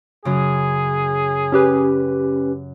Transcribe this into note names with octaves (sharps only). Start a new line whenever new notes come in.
F#2 C#3 G#4
C#4 G4 B4